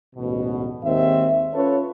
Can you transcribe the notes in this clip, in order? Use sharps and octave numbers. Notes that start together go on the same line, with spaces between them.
A1 D2 G#2 B2
D#2 G#2 D#3 C4 E5
C#4 F4 A4 B4 C#5